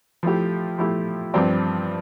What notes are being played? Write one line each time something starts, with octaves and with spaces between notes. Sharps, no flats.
F3 A3 E4 G4
F3 A3 E4 G4
G2 F3 C4 G4 D5